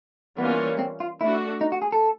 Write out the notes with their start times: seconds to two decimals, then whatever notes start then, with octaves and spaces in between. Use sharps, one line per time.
0.38 E3 G3 A#3 B3 C#4 F4
0.79 C4
1.00 F4
1.20 A3 D4 E4 F#4
1.61 D#4
1.72 F#4
1.82 G#4
1.92 A4